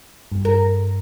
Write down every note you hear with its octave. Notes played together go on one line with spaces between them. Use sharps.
G2
A#4